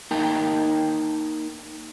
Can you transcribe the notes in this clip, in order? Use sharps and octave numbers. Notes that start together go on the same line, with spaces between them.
A#3 D#4 A#4 G5 A5